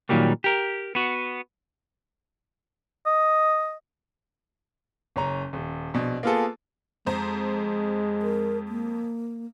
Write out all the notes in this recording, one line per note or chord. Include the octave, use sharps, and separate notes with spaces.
A#2 D#3 F#3 G3 A#3
G4 A#4
B3 F#4
D#5
F#1 C#4 A#5
D#1
A#1 B2
A#3 B3 F4 G#4 A4
F2 G#3 C5 A#5
A#4
A#3